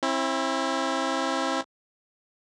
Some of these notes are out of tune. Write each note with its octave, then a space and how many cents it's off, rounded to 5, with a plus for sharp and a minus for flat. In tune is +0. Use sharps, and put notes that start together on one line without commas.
C4 +40 E4 +0